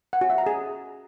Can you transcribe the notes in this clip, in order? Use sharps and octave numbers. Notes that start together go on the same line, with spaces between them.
F#5
F#4
E5
A#5
G#4